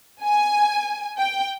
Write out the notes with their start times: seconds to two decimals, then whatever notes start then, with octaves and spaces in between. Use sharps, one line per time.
0.23 G#5
1.17 G5